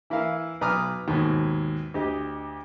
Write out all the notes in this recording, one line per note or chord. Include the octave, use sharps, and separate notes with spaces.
E3 E4 A#4 F5
B1 B4 A#5 D6 D#6 F6
D#2 G#2 B2
D2 G4 D#5